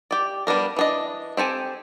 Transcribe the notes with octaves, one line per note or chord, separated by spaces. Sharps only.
G4 D5
G3 B3 D4 A#4
E3 D4 D#5
C4 G4 A4 G#5